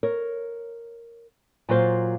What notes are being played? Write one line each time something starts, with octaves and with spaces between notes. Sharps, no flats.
A#4 C#5
A#2 F#3 F4 C5 F5